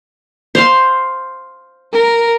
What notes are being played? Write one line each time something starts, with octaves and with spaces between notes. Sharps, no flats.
C5 F5 C6
A#4